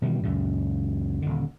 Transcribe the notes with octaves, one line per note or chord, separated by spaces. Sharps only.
B2 D#3 E3 G3
C#2 F#2 A#2
D#1 D3